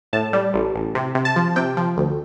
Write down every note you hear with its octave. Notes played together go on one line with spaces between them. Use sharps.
A2 A5
G3
A1
A1
C3
C3
A5
F3
C3 G5
F3
D2